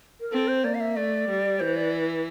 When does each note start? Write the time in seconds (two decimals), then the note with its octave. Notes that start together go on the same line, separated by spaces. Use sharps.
0.20 A#4
0.32 C4 A4
0.48 C5
0.64 A#3 D5
0.75 F5
0.80 E5
0.96 A3 D5
1.29 G3
1.60 E3 C5
1.76 D5